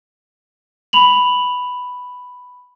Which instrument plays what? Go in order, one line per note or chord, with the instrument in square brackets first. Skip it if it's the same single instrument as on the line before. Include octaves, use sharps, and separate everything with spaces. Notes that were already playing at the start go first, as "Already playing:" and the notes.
[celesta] B5 F7 F#7